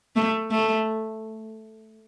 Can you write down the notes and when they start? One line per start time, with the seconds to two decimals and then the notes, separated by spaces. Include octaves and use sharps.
0.16 A3
0.51 A3